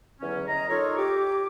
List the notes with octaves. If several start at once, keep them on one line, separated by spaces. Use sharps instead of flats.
E2 D3 F#3 C#4
D#5 A#5
D#4 F4 A4 A#4 C#5
G4 D6